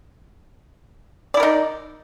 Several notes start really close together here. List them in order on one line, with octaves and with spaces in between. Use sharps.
D5 E4 A#4 D#4